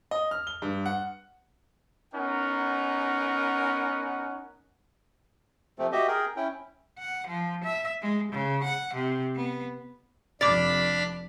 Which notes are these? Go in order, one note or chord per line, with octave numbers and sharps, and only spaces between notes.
D#5
F6
G7
G2
F#5
B3 C#4 D#4 A#4 F#5
C3 F3 A3 C4
F#4 G4 D#5 E5
G#4 A#4 G5
C#4 E4 G5
F#5
F3
E5
G#3
C#3
F#5
C3
B3
F1 F2 D4 D5 B5 D6 F6 A6